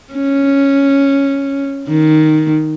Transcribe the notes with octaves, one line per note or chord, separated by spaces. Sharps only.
C#4
D#3